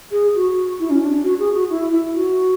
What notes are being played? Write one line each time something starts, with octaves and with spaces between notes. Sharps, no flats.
G#4
F#4
E4
C#4
D4
F#4
G#4
F#4
E4
E4
F#4